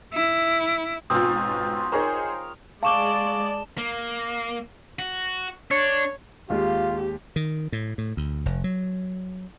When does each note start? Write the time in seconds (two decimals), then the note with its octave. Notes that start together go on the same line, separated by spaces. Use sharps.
0.14 E4
1.10 G#2 B2 C4 C#4 F4 D#6
1.92 D#4 G#4 A#4 C5 C#5
2.83 G#3 D5 F5 A5 C#6 D6 E7 G7
3.78 A#3
4.99 F#4
5.71 D4 C#5
6.50 D#2 G#3 F4 G4 F5
7.36 D#3
7.72 A2
7.98 A2
8.17 D2
8.46 F1
8.64 F#3